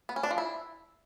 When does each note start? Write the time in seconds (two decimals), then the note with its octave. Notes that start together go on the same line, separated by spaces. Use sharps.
0.09 B3
0.16 C#4
0.23 D4
0.31 F3
0.38 E4